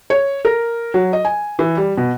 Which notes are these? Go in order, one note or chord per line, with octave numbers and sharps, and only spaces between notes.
C#5
A#4
F#3
D#5
G#5
E3
G3
B2